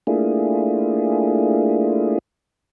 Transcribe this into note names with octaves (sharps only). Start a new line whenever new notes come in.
A3 A#3 D4 E4 F4 G#4